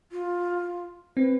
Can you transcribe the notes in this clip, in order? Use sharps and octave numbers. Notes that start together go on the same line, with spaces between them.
F4
C4 B4